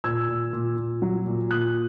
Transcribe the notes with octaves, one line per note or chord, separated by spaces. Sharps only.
A#2 E6 G#6
A#2
A#2
A#2
F#3
A#2
A#2 D#6 F#6